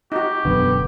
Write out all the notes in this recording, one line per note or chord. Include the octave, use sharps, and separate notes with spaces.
D#4 F#4 G4
E1 F#2 D3 B3